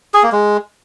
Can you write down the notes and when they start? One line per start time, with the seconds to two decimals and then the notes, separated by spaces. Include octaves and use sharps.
0.14 G#4
0.23 A#3
0.32 G#3